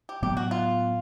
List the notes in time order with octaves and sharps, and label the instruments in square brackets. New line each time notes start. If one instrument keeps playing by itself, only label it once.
[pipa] G4
[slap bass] A2 F#3 B3 [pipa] G4
[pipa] F#4
F4